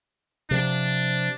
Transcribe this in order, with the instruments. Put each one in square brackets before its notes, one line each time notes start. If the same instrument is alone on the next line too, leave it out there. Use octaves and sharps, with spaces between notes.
[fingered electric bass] C3 F3 [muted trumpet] D4